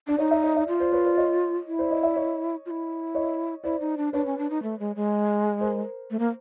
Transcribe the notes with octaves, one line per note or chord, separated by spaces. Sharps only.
D4 D5
D#4 C#5 D#5
D5 E5
C#5 D#5
D5 E5
F4
C5 D5
B4 C#5
C5 D5
C#5 D#5
E4
C5 D5
C#5 D#5
D5 E5
C#5 D#5
F4
E4
C#5 D#5
E4 C5 D5
D#4
D4
D4 B4 C#5
C#4
D4
D#4
A3
G#3
G#3
A#4 C5
A3
A#3